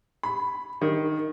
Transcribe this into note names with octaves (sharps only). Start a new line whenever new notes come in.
B5
D#3